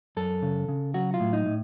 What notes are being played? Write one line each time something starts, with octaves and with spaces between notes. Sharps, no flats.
F#2 A4
C#3
C#3
F#3 F#4
F4
A2
D#4
A2